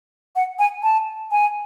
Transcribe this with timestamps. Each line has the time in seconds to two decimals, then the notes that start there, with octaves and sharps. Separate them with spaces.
0.36 F#5
0.59 G#5
0.83 A5
1.31 G#5